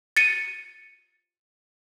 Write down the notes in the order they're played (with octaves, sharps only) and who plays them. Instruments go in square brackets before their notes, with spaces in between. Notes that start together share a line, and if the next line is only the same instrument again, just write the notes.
[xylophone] A6 C#7 D#7